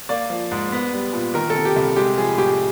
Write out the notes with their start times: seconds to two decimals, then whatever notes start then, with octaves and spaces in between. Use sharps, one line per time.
0.09 A#3 D5
0.30 F3
0.51 G#2
0.72 B3
0.93 G3
1.13 A#2
1.34 D#3 A#4
1.50 A4
1.55 C3
1.65 G4
1.76 C2
1.96 G#3 G4
2.17 F3 G#4
2.38 A2 G4